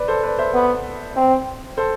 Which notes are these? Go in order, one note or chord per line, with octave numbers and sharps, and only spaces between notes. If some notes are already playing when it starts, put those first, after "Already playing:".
Already playing: B4 D5
A4 C5
B4 D5
C5 E5
B3
C4
A4 C5